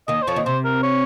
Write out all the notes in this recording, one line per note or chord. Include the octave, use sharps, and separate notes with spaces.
D#2 D#3 D#5
C5
F2 F3 C#5
D#2 D#3
C3 C5
A#4
C#5